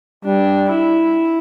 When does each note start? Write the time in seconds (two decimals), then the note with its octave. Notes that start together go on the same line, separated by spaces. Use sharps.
0.25 G3 D4
0.70 E4